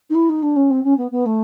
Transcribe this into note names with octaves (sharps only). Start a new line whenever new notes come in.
D#4
E4
D#4
D4
C#4
C4
C#4
B3
B3
A3